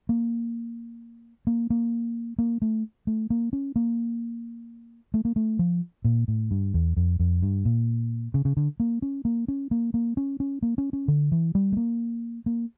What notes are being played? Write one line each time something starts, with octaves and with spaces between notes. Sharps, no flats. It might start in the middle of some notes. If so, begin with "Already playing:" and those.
A#3
A#3
A#3
A#3
A3
A3
A#3
C#4
A#3
A3
A#3
A3
F3
A#2
A2
G2
E2
F2
F2
G2
A#2
C#3
C#3
D3
A#3
C#4
A#3
C#4
A#3
A#3
C#4
C#4
A#3
C#4
C#4
D3
E3
G3
A3
A#3
A#3